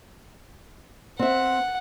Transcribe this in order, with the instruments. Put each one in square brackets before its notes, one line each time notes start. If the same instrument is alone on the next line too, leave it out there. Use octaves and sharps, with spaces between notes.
[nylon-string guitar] C4 E5 [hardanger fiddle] F#5